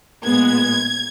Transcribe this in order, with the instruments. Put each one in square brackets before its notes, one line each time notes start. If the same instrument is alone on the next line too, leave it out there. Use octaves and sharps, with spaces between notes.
[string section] A#2 G#3 B3 G#6